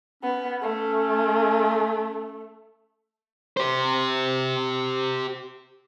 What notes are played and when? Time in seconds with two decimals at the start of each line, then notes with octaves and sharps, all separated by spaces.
0.23 B3 C#4
0.62 A3
3.57 G4 C5